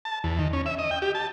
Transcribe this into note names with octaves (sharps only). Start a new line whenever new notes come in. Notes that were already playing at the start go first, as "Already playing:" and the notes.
A5
E2
D#3
C#4
E5
D#5
G5
G4
A5